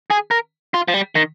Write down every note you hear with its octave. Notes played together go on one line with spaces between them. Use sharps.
G#4
A#4
F4
F3
G3
D#3